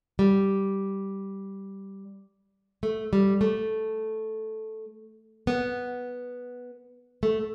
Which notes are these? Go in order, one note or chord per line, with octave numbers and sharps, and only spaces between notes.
G3
A3
G3
A3
B3
A3